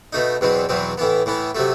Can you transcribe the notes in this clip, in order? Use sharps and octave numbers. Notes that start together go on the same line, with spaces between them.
B2 A3 D#4
E2 B2 F#3 C4
E2 B2 F#3 C4
A2 E3 B3
A2 E3 B3
C3 F#3 A3